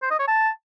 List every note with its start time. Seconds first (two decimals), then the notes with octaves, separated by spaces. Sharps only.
0.02 C5
0.11 D#5
0.19 C#5
0.28 A5